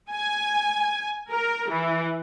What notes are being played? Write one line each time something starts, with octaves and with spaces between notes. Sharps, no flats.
G#5
A#4
E3